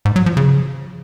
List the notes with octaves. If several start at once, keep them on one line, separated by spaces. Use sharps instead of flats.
G#2
F#3
F3
C#3